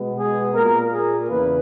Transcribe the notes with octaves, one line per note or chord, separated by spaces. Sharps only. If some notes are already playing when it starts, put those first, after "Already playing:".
Already playing: B2 G#3 B3
G#4
A#2 A#3 A#4
G#4
E2 C#3 B4